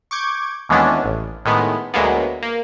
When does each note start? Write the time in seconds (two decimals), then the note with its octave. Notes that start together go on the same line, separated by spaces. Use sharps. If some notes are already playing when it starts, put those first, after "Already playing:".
0.11 C#6 D6 G6 G#6
0.69 D#2 E3 G#3 B3 C#4 D4
1.04 A1
1.45 A2 D#3 G#3 B3
1.94 D2 F#3 G#3 A#3 B3
2.42 A#3